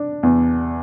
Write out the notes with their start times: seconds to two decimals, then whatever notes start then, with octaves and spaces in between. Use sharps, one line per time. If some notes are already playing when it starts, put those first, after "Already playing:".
Already playing: D4
0.23 E2